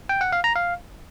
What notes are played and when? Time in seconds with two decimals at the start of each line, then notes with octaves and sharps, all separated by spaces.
0.09 G5
0.21 F#5
0.33 F5
0.44 A#5
0.56 F5